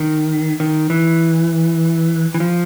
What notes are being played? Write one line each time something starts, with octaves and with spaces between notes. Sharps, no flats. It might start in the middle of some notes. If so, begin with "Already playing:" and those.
Already playing: D#3
D#3
E3
E3
F3